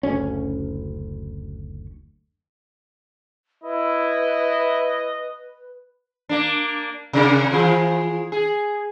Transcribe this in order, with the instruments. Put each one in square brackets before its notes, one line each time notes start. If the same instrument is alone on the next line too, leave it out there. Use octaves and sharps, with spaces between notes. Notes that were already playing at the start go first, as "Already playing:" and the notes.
[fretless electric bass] F#1 D2 C#4
[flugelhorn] E4 [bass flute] B4 [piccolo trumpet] D#5
[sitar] A#3 D4
C3 D4 A#4
E3 F3 G#4
G#4